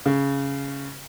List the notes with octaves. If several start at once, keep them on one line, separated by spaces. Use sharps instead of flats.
C#3